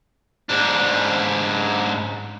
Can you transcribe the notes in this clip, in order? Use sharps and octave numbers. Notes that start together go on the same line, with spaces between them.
G#2 D4